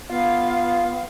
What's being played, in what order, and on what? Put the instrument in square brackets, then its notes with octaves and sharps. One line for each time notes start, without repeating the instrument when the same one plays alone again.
[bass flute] B3 [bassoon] F4 [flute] F5